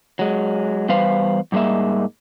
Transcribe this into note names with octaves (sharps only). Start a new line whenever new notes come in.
F#3 G#3
E2 G3 B4 C5 F5
G#2 G3 G#3 A#3 E5